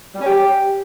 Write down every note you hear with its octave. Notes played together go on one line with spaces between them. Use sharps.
G3
C#4
G4